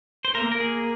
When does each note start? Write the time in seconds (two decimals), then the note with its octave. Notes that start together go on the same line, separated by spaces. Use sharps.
0.25 C5
0.35 A#3 A#4
0.52 A#4
0.60 G#4